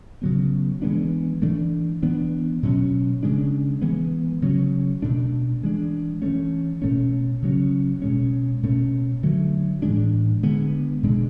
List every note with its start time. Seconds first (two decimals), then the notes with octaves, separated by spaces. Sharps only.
0.22 C#3 F#3 B3
0.82 E3 G#3 B3 D4
1.42 E3 A3 D4
2.03 E3 B3 D4
2.63 B2 F#3 C#4
3.23 C#3 G#3 D4
3.82 E3 G#3 B3
4.42 C#3 F#3 C#4
5.02 B2 A3 D4
5.63 E3 G#3 D4
6.22 E3 A3 C#4
6.82 B2 A3 C#4
7.42 C#3 F#3 C#4
8.02 B2 G#3 C#4
8.63 B2 A3 C#4
9.23 D3 F#3 A3
9.82 A2 E3 G#3 D4
10.43 D3 G#3 B3
11.03 B2 G#3 D4